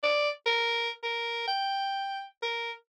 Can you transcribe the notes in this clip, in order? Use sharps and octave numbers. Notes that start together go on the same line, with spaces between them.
D5
A#4
A#4
G5
A#4